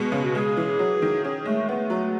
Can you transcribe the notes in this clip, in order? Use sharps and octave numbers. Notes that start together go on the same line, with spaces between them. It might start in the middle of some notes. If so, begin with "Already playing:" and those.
Already playing: B2 G#3
C#3
F#4
G#3 G#4
E3
F#3
D#3
C#4 G#4
G#3 A3
A3 B3
F#3